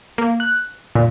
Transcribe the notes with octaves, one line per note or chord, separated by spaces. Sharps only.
A#3
F#6
A#2